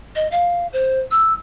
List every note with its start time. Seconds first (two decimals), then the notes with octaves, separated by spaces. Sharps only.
0.16 D#5
0.32 F5
0.73 C5
1.11 E6